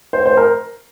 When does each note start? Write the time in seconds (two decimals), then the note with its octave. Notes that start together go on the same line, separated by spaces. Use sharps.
0.13 C5
0.26 C5
0.37 A#4